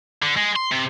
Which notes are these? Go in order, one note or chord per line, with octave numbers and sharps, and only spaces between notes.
D3
G#3
C6
C3